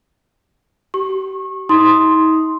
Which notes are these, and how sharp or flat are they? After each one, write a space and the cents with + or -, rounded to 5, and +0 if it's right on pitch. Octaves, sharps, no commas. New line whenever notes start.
G4 -35 C#6 -30
D#4 +40 C6 +0 D#6 +0